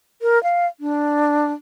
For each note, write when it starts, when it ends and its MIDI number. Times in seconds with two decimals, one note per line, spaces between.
0.22 0.41 70
0.43 0.66 77
0.80 1.52 62